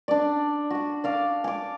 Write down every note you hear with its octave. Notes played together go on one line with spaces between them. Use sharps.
D4 D5
F#4 F#5
D5 F5 D6
G#5 D6